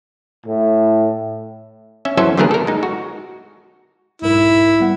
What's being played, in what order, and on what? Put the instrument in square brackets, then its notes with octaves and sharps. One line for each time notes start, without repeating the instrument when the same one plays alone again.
[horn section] A2
[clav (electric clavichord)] C#4 E5
E3 F#3 C#4 A4 C5 E5
D3 F#3 A3 B3 G#4 A#4
A4 A#4
G#3 D#4
F#4
[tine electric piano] B1 G#2 A#4 [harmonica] E4
[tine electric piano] G3 B3 F#5